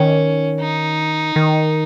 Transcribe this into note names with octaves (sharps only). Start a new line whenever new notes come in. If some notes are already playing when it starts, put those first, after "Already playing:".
Already playing: D#3 C#4
D#4
D#3